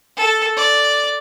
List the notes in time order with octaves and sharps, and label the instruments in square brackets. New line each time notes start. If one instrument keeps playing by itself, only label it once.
[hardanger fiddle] A4
D5